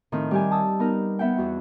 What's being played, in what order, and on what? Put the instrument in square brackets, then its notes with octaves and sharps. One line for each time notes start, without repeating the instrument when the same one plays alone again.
[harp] A2 D#3 F3 C4
G3 G4 G#5
A5 D#6 E6
B3 D#4 A#4
B3 E5 F#5 G5
E2 F#4